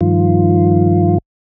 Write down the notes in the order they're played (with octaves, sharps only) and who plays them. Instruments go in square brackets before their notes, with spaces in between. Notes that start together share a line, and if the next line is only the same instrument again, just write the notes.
[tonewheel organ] G2 D#3 F3 F4